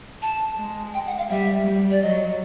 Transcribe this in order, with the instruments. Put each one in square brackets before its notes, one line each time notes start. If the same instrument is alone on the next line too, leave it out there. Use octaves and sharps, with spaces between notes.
[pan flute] A5
[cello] G#3
[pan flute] G5
F#5
F5
[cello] G3 [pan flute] E5
[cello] G3
[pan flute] D5
[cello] F#3 [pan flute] D#5